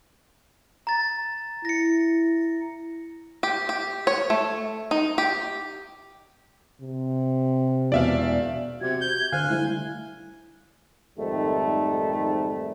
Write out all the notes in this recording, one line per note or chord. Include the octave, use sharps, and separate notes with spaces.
A#5 A6
E4 A#6 C#7
G4
G4
C#5
A3
D#4
G4
C3
E1 E2 D5 E5 F5
C3 F#4 G#6
G6
D3 C5 F5 G#5 F#6
G3 A3 E4
F2 G#2 D#3 G3 A3